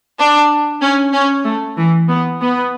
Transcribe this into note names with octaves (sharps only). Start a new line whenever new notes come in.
D4
C#4
C#4
A3
E3
B3
B3